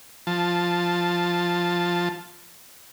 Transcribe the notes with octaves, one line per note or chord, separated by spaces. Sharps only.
F3 A5